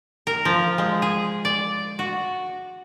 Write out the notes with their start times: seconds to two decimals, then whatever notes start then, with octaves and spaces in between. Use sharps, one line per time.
0.27 A#4
0.45 F3
0.78 G#3
1.02 G#4
1.45 D5
1.99 F#4